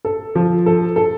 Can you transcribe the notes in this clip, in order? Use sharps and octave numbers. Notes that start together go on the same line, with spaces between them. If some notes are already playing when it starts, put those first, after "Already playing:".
A4
F3
A4
A4